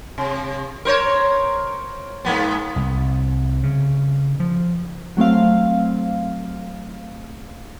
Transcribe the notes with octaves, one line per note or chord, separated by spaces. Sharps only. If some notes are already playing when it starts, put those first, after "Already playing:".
C3
A#4 C5 C#5
G#2 A#3 B3
C2
C#3
F3
F#3 A3 C4 F5